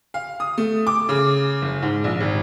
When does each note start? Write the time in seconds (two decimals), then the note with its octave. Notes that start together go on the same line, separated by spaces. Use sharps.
0.14 F5
0.40 D#6
0.58 A3
0.87 D6
1.09 C#3
1.62 F#1
1.82 G#2
2.04 A#1
2.20 G#1